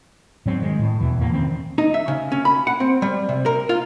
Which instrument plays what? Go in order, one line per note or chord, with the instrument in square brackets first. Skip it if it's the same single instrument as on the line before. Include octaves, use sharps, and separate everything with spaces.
[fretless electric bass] G#2 F#3 C4
D#3 G#3
A2
E2 B2 E3
E2 A2 A#3
D#3 E3 C4 C#4
[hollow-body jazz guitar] D#4
E5
C#3
C#4
B5
F#5
C4
G3
C3
A#4
F4